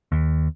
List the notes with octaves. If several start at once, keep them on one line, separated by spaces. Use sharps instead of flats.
D#2